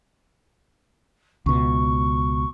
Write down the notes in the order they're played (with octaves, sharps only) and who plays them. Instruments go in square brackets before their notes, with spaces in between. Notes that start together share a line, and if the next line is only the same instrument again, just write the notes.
[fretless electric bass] C#2 B2 [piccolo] C#6